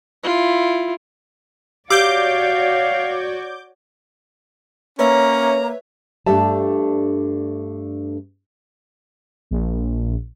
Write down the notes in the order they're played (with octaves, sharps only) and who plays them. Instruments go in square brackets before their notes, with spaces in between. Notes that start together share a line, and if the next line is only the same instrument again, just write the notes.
[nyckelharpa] E4 F4
[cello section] F#4 C#5 D5 [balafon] G4 [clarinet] F5 [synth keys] D6 G6
[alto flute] A#3 [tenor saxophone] C#4 [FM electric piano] B4 C#5 E5 [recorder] A#5
[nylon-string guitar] G2 A3 D4 G4 E5 A5
[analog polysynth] A#1